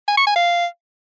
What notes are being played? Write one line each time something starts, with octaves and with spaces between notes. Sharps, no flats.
G#5
C#6
G#5
F5